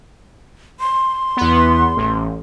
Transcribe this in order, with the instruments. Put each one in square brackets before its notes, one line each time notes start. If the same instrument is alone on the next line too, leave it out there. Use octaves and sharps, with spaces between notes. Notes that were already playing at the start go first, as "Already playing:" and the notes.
[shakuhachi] C6
[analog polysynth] E2 B3
A1